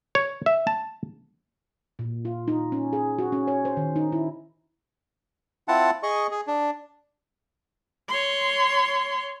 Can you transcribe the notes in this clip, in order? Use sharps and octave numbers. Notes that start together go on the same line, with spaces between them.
C#5
E5
A5
A#2
F4
D#4
C#4
G#4
F#4
C#4
C#5
C5
D#3
D#4
E4
C4 E4 F4 F#5 A5
G#4 D#5 C#6
G#4
D4
C#5 C6